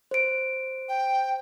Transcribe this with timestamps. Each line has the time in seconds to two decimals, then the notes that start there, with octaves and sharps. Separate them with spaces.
0.11 C5 D7
0.89 G5